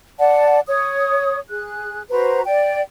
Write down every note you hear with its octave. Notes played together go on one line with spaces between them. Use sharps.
D5 F#5 A5
C#5 D#6
G#4 F#6
F#4 B4 C5 A#5
D5 G5